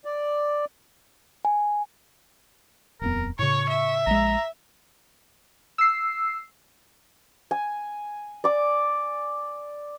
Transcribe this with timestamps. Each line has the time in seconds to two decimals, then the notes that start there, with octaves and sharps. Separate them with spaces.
0.05 D5
1.45 G#5
3.01 D#1 F2 B3 A#4
3.39 A2 C#3 C#5 C#6
3.69 E5
4.07 A#1 G#3 A#5
5.78 E6 C7
7.51 G#5
8.44 D5 D6